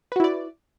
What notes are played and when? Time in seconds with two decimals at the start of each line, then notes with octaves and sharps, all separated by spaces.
0.12 B4
0.16 F#4
0.20 E4
0.24 D5